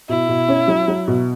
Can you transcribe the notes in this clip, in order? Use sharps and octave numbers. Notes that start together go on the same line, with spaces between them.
B2 E4
B2
C#4
F#3
F#3
B2